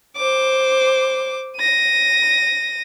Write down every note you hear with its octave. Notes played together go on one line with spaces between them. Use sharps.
C5 D6
A#6 D#7